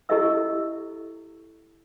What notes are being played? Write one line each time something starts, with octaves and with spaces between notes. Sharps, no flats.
E4 G4 A4 D#5 E5 E6